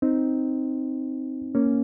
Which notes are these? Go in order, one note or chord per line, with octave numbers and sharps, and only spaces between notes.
C4 D#4
A#3 C#4